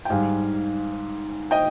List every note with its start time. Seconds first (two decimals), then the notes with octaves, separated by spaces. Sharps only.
0.05 G5
0.09 G#2 G3 F5 G#5
1.51 D#5 G5